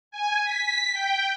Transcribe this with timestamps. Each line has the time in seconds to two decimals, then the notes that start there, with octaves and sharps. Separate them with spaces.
0.11 G#5
0.44 B6
0.92 G5